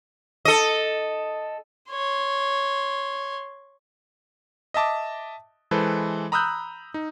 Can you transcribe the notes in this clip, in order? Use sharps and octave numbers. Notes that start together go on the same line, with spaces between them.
A4 D#5
C#5 C6
D#5 E5 A5 D6
E3 G#3 A4 B4 C5
A#5 B5 D#6 E6 F#6 G6
D#4